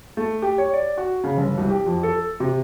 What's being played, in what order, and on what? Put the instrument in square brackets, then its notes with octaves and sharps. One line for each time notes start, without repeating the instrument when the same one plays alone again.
[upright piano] A3
G4
C#5
D5
F#4
C#3
G1
C2
G4
F2
A4
C3